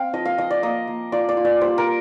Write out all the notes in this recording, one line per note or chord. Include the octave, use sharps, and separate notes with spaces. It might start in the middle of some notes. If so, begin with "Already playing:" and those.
Already playing: C4 F5 G5
F3 D#5
F5
F3 D#5
D5
A#3 D#5
A#3
F4 D5
D5
F4
D5
G3 C5
A#4